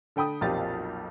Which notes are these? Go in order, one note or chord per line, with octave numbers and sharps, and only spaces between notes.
D3 A4 G5 B5 D#6
B1 F2 A#2 F4 G4 A6